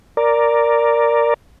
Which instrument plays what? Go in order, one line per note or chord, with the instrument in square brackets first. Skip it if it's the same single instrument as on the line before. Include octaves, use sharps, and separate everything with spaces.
[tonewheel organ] A#4 D5